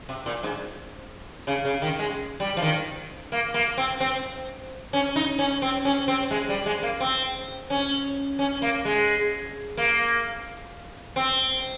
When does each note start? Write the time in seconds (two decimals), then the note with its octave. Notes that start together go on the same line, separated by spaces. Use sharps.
0.09 C3
0.26 A#2
0.43 G#2
1.47 C#3
1.65 C#3
1.82 D#3
1.99 G#3
2.40 G3
2.57 F3
2.62 D#3
3.32 A#3
3.54 A#3
3.77 C4
4.00 C4
4.93 C#4
5.16 D#4
5.39 C#4
5.62 C4
5.85 C#4
6.08 C4
6.31 G#3
6.49 G3
6.66 G#3
6.83 A#3
7.00 C4
7.70 C#4
8.39 C#4
8.62 A#3
8.85 G#3
9.77 A#3
11.16 C4